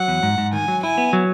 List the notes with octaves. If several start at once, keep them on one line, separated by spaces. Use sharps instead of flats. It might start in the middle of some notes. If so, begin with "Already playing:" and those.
Already playing: F#3 F#5
E2
G#2
G#2
D#3 G#5
F#3
E4 G#5
B3
F#3